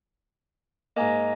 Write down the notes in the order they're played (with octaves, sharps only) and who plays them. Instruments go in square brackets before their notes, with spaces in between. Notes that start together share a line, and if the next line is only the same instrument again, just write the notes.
[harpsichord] G#2 A#3 [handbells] D#5 G#5 A#5